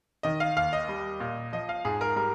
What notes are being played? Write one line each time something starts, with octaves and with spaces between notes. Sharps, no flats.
D#3 D#5
F5
D#2 F5
D#5
G3
A#2
F3 D#5
F5
G#2 G#4
A#4
G3 A#4